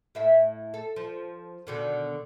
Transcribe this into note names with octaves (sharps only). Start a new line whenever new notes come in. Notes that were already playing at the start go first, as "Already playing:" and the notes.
A2 E5 F5
A4
F3
B2 D3 D#3